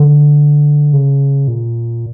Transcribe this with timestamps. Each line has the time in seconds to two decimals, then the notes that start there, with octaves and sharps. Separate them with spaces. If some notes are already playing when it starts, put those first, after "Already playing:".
Already playing: D3
0.93 C#3
1.48 A#2